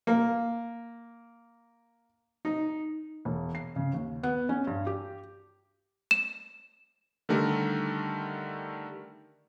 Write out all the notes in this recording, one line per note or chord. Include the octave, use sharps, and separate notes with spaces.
A#3
D#4
E1
C7
C#3
D#2
B3
C#4
G2
G4
E7
D3 D#3 G3 A3 A#4